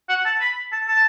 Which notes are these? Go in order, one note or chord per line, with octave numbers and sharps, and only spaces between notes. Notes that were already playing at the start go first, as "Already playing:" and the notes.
F#5
A5
B5
A5
A5